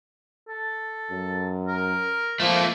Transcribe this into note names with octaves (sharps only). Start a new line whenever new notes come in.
A4
F#2
A#4
F3 A3 A#3